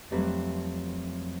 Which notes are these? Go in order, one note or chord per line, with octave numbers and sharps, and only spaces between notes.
F2 F#3 G3 A3 C4 B4